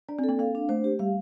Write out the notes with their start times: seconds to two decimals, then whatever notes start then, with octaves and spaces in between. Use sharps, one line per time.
0.09 D4 D5
0.19 C4
0.24 A4
0.29 A#3
0.39 A#3 F5
0.55 D4
0.69 A3 C5
0.84 G4
0.99 G3 F5